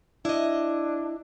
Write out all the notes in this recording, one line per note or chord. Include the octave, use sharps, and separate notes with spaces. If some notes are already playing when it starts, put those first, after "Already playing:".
D4 E4 D#5